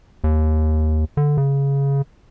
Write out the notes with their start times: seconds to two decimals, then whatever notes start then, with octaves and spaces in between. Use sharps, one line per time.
0.24 D#2
1.17 D3
1.37 C#3